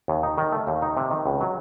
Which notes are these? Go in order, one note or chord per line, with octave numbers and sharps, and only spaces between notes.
D#2
D#4
D#3
A3
D#2
D#4
C3
D#3
C#2
F#3